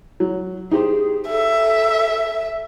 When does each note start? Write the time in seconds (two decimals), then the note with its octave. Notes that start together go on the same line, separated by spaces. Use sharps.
0.20 F#3
0.71 D#4 G4 G#4 C5
1.29 A4 E5